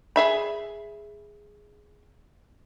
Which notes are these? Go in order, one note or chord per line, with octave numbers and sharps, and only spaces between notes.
G#4 E5 B5